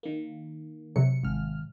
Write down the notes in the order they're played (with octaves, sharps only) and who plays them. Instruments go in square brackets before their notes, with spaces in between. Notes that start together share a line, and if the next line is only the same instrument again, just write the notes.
[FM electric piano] D#3 A#3
[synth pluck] C3 F#3 [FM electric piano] C#7
[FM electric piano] G#1 F6